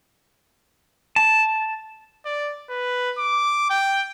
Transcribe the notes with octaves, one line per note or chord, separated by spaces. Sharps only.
A5
D5
B4
D6
G5